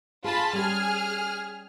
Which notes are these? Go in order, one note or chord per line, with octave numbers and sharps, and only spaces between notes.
F4 G#4 A5 B5
G3 C#4 G4 G#4 F6